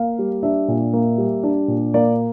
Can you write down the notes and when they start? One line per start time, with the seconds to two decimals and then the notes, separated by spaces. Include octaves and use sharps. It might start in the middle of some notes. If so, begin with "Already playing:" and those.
Already playing: A#3 F5
0.19 G3
0.43 D4 E5
0.68 A#2
0.93 A#3
1.18 G3
1.43 D4
1.68 A#2
1.94 A#3 D5